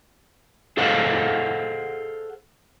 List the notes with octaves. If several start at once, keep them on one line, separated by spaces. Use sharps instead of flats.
G#4 A4 C5 D#5 F5 F#5